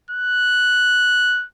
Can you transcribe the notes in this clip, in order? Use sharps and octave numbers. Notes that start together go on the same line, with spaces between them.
F#6